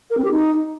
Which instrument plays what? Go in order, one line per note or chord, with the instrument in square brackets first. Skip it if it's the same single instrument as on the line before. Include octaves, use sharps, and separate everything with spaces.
[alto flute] A#4
C4
G4
D#4